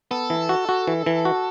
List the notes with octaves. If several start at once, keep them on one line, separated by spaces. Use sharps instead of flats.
B3 A4
E3
F#4
F#4
E3
E3
F#4